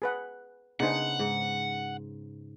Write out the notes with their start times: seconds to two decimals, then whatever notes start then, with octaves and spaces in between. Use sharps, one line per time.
0.02 G#4 B4 F#5
0.80 C#3 B3 D4 D#4 G#4 C5 F#5
1.19 G#2